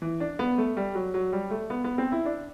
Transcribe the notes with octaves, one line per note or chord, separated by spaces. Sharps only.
E3
D4
B3
A3
G3
F#3
F#3
G3
A3
B3
B3
C4
E4
D4